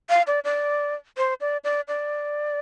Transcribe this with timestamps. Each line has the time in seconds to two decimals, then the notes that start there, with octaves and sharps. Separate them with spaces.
0.10 F5
0.27 D5
0.44 D5
1.17 C5
1.41 D5
1.64 D5
1.88 D5